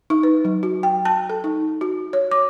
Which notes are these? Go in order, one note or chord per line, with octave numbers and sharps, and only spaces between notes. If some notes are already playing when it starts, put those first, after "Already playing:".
D#4
B4
F#3
F#4
G5
A5
A4
D#4
F#4
C#5
D6